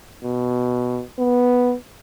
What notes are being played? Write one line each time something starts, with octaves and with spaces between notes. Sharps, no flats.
B2
B3